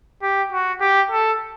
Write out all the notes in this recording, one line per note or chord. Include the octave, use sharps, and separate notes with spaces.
G4
F#4
G4
A4